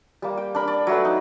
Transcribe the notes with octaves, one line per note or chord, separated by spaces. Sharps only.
G3 A#3
G5
D4 A#4 B5
D5
F#3 A3 B4
D#4